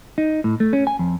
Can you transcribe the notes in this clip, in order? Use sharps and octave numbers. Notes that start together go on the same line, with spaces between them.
D#4
A2
A3
C#4
G#5
F2